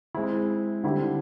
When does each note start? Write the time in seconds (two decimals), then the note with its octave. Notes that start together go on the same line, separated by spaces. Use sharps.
0.15 G#3 C4 E4
0.84 D3 G3 C4 E4 G4